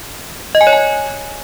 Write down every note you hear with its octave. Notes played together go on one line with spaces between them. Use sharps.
D#5
G#5
C#5
G#5